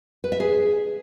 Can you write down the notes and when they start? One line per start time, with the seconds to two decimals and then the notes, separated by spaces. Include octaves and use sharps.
0.24 B4
0.32 E5
0.40 G#4